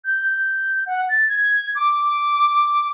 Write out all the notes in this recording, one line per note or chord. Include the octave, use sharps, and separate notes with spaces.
G6
F#5
A6
G#6
D6